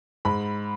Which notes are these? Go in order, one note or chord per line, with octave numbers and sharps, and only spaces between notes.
G#2 B5